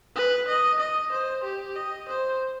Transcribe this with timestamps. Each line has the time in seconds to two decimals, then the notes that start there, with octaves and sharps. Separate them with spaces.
0.16 B4
0.48 D#5
0.79 D#5
1.12 C5
1.44 G4
1.76 D#5
2.08 C5